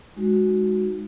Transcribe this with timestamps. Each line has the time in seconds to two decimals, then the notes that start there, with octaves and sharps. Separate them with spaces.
0.16 G#3 D#4 F#4